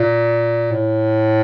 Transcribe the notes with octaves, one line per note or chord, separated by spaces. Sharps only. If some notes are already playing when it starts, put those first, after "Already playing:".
Already playing: A#2
A2